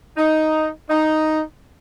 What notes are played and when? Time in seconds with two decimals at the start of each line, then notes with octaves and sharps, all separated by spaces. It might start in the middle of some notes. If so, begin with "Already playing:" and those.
0.17 D#4
0.90 D#4